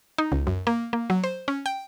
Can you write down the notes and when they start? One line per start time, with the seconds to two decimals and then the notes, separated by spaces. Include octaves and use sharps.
0.18 D#4
0.32 C#2
0.47 F#2
0.67 A#3
0.93 A#3
1.10 F#3
1.24 C5
1.48 C#4
1.66 G5